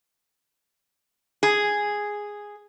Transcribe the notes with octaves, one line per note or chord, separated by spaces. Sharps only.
G#4